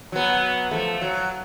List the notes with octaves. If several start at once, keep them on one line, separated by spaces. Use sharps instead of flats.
F#3 B3
F3 A3
F#3